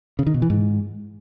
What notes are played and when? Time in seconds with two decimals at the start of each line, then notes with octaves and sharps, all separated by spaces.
0.19 C#3
0.27 D#3
0.34 B2
0.42 E3
0.50 G#2